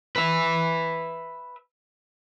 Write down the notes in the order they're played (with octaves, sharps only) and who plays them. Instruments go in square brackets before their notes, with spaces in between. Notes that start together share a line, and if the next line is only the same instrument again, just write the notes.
[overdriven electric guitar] B4 E5